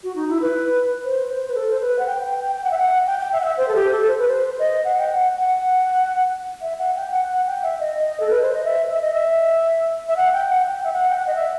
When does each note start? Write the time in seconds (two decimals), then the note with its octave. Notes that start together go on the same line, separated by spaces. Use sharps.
0.03 F#4
0.16 D#4
0.29 E4
0.42 B4
1.05 C5
1.30 C5
1.48 B4
1.55 A4
1.71 C5
1.81 B4
1.99 F#5
2.06 G5
2.22 G5
2.40 G5
2.56 G5
2.64 F#5
2.71 E5
2.78 F#5
3.07 G5
3.20 G5
3.33 E5
3.41 F#5
3.45 E5
3.58 C5
3.68 A4
3.75 G4
3.92 A4
4.08 C5
4.19 B4
4.28 C5
4.59 D#5
4.84 F#5
4.98 G5
5.10 F#5
5.35 F#5
6.62 E5
6.79 F#5
6.96 G5
7.12 F#5
7.29 F#5
7.46 G5
7.63 E5
7.80 D#5
7.96 D#5
8.20 A4
8.30 B4
8.42 C5
8.53 D#5
8.64 E5
8.90 E5
9.01 D#5
9.14 E5
10.09 E5
10.17 F#5
10.33 G5
10.50 F#5
10.67 G5
10.84 E5
10.93 F#5
11.10 G5
11.18 F#5
11.27 D#5
11.35 E5